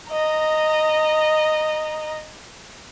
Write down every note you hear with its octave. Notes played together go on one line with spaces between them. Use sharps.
D#5 A#5